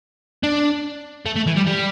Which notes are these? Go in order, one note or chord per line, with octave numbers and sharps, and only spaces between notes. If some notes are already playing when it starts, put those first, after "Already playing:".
D4
A3
A3
E3
G3
G3